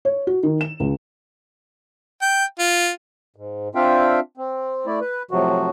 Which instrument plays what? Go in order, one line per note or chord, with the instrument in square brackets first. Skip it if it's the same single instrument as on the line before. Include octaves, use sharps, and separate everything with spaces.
[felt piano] C#5
F#4
D#3
E7
C#2
[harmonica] G5
F4
[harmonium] G#2
C4 D4 F4 E5 F5 G5
C4
A3 E4 D5
B4
A2 C3 F3 F#3 F#4